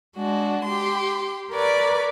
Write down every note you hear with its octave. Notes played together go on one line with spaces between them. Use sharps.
G#3 D4 F#4
G4 C6
A#4 B4 C#5 D5 D6